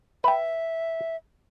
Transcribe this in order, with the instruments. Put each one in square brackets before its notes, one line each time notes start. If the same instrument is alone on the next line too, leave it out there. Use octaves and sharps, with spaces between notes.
[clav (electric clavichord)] B4 G5 [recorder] E5